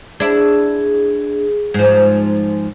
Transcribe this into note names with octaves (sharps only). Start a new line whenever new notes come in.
D4 E4 G#4
G#2 F3